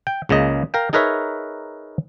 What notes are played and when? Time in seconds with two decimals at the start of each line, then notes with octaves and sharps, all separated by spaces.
0.07 G5
0.29 C#2 C#3 A#3 D#5
0.74 A#4 F5 G5
0.93 D#4 G#4 A#4 B4 C#5 E5